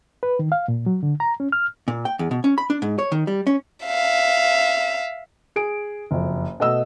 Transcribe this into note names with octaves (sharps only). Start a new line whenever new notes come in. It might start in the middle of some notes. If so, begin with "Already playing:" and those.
B4
D#3
F5
A#2
F#3
D3
A#5
C#4
F6
A#2
G5
E2
B2
C#4
B5
D4
G#2
C#5
D#3
G3
C#4
E5 F5
G#4 D7
F#1 F2
B2 A3 D#5 E6